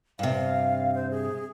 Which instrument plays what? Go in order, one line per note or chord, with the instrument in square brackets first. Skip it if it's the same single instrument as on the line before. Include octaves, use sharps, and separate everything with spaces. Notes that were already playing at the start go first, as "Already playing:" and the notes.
[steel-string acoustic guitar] G2 C3 [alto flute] F5
[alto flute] C5
G#4